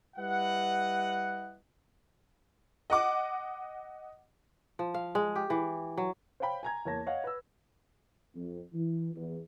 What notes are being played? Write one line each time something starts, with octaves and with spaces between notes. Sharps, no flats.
G3 E4 B4 D#5 F#5
D#5 F#5 D6
F3
F5
G#3
G4
E3
F#3
C5 C#5 F5 G5 B5
G#5 A#5 G#6
E2 A#3 C#5 A5 A#6
C#5 D#5 F5 F#5
B4 E6
F2
E3
E2